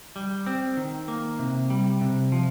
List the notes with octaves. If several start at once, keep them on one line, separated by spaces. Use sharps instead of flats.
G3
C4
D#3
A#3
C3
G3
C3
F3